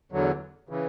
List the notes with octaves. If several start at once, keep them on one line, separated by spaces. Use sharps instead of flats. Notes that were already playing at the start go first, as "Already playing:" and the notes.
E2 D3 F#3
C#3 E3